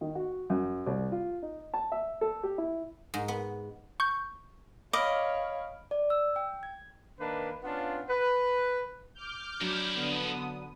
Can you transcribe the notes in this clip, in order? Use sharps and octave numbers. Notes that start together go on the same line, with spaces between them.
D#3
F#4
F#2
C2
F4
D#4
A5
E5
A4
G4
E4
G#2
B3
C#6 G6
C#5 D#5 F5 B5 D6 F6 D7
D5
E6
G5
G#6
D#3 A#3 D4 B4
B3 C#4 D4 F4
B4
D6 F6 G6
F2 F#3 D4 E4
D3 B3 D#6